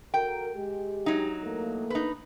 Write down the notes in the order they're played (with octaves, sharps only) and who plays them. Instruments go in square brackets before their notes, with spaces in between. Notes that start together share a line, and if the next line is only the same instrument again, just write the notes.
[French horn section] F#4 A4 A#4 [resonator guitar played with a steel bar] G5
[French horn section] G#3 G4
[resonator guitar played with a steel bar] F#3 D#4
[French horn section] E2 A3 A#3
[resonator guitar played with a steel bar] D#4 B4